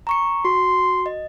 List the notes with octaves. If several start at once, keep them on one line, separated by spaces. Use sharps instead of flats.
A#5 C#6 C#7
F#4 C6
D#5